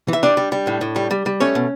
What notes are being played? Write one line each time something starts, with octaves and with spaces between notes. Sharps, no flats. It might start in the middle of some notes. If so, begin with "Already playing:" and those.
E3 E5
G3 D4 D5
G3
G3
A2
A2
G3
G3
G3
A3 C#4 C#5
B2